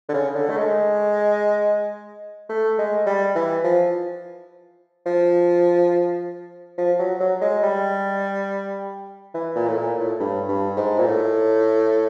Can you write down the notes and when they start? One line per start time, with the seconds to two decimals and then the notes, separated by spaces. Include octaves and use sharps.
0.09 D3
0.14 C#3
0.35 D3
0.49 A3
0.57 G#3
2.49 A3
2.78 G#3
3.06 G3
3.35 E3
3.64 F3
5.06 F3
6.78 F3
6.99 F#3
7.20 F#3
7.41 G#3
7.63 G3
9.34 E3
9.56 A#2
9.67 A2
9.77 A#2
9.99 A2
10.20 G2
10.49 G2
10.77 G#2
10.98 A#2
11.06 A2